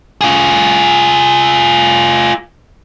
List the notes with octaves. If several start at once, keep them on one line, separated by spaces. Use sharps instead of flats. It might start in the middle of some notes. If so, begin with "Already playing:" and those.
F4 G#4